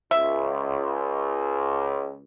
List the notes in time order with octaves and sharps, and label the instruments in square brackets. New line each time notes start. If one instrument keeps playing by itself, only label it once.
[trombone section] C#2 [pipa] E5